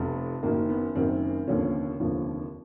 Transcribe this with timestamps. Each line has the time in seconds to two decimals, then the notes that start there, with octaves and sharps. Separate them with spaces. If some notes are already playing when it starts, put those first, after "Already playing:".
Already playing: F1 F2 C3 B3
0.43 F#1 F#2 D#3 A#3
0.69 B3
0.95 F#1 F#2 D#3 C4
1.48 F1 D#2 D3 F3 C#4
2.00 F1 D#2 D3 F3